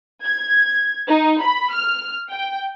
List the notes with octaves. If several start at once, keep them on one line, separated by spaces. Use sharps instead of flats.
G#6
D#4
B5
F6
G5